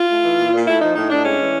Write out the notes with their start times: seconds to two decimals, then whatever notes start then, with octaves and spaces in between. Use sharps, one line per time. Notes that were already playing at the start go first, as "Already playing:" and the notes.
Already playing: F4
0.09 A3
0.23 E3
0.38 A#2
0.52 A#2
0.66 A3 E4
0.81 F3 D#4
0.95 A2 D#4
1.10 A2 D4
1.25 G#3 C#4
1.40 E3